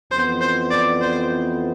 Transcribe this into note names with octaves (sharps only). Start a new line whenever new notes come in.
F2 E3 B3 C5
C5
D5
C5